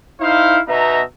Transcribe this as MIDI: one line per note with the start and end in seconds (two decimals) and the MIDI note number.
0.21 0.59 63
0.21 0.59 64
0.21 0.59 72
0.21 0.59 77
0.68 1.02 47
0.68 1.02 59
0.68 1.02 63
0.68 1.02 76
0.68 1.02 82